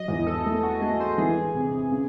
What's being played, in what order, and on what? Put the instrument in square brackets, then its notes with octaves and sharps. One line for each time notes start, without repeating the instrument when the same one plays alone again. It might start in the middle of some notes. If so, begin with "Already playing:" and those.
Already playing: [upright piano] F#3 [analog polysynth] D#5
[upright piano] E2
[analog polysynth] A4
[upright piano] A3
[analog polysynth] F#4
[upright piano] A3 [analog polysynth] G#4
[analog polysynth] C5
[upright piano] E3 [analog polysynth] G#4
[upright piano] C3
C#3